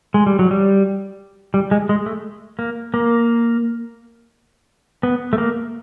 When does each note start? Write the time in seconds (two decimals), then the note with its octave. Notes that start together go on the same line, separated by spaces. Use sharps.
0.14 G#3
0.26 G3
0.39 F#3
0.51 G3
1.54 G3
1.71 G#3
1.89 G#3
2.06 A3
2.59 A#3
2.94 A#3
5.03 B3
5.33 A3
5.38 A#3